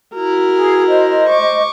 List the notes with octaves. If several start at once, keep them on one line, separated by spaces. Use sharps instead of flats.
E4 F#4 A#4
G#4
C5 D#5
C#6 D6